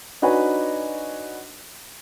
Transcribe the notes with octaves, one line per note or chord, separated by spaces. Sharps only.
D4 D#4 F#4 B4 C#5 G#5